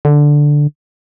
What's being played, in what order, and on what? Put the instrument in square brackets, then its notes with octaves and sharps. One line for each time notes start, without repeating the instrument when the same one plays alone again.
[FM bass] D3